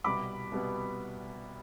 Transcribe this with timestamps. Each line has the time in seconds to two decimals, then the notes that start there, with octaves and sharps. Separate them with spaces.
0.04 C2 B2 G3 B3 B5 D6
0.52 C2 B2 G3 B3